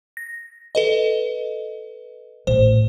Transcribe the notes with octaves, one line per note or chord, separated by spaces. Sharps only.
A#6
A4 B4 D#5
A1 C5